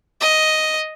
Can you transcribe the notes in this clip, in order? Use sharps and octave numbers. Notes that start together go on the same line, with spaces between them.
D#5